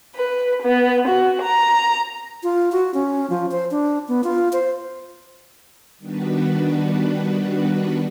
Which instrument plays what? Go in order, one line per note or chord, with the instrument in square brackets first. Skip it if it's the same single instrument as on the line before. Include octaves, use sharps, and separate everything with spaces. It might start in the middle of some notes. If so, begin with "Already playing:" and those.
[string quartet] B4
B3
F#4
A#5
[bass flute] F4
F#4
C#4
F3
C5
D4
B3
F4
C5
[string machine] D#3 G3 B3 D4 F#4 B4